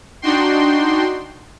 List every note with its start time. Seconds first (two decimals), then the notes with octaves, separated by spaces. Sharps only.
0.22 D4 D#4 F#4 G5 C6